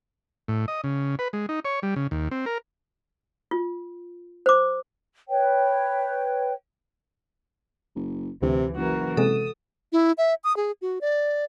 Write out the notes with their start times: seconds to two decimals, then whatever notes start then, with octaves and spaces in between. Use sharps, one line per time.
0.48 A2
0.68 D#5
0.84 C#3
1.19 B4
1.33 G#3
1.49 D#4
1.65 C#5
1.83 G3
1.96 C#3
2.11 D#2
2.31 C4
2.46 A#4
3.51 F4
4.46 C5 D6
5.29 B4 C#5 G5
7.96 F#1
8.42 D2 C3 E3
8.76 F#1 E3 F#4 A#4
9.17 C3 G#3 A4 D#6
9.93 E4
10.18 E5
10.44 D#6
10.57 G#4
10.82 F#4
11.01 D5